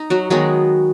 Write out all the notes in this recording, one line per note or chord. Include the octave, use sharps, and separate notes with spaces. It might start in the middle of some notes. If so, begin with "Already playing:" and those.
Already playing: D#4
F#3 F#4
D#3 F#3 G#3 B3 D#4 G#4